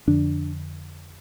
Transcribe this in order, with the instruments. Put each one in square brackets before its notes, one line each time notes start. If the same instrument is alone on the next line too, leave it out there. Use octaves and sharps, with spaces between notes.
[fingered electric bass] F2 D3 D4